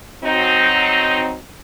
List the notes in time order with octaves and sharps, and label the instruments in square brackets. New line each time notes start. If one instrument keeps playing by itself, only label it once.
[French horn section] F#3 C4 D#4